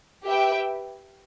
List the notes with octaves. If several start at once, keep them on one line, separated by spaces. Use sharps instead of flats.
G4 B4 E5 G5